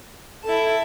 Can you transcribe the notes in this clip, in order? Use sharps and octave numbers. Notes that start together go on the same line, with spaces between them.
E4 A4 A5